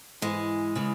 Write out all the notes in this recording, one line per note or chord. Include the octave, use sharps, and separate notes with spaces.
G#2 E3 G#3
C#3 E3